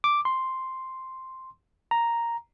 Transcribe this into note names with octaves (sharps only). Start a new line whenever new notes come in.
D6
C6
A#5